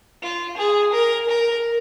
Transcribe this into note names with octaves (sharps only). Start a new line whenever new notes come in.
F4
G#4
A#4
A#4